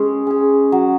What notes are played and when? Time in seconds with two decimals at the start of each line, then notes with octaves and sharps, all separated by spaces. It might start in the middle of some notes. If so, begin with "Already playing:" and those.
Already playing: G#3 C#4 G#4
0.27 C#4 G#4
0.72 F#3